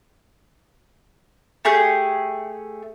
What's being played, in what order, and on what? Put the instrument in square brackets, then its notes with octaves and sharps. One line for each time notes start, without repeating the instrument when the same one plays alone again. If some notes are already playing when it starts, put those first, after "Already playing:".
[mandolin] A3 G4 G#4 G6